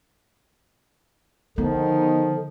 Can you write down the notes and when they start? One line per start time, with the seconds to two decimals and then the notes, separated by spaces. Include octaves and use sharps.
1.58 D3 D#3 F3 B3 D#4